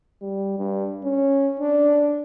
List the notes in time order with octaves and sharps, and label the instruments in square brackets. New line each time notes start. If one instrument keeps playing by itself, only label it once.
[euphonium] G3
G2
C#4
D4